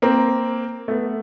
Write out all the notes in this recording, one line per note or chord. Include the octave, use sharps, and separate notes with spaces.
A#3 C4
A3 B3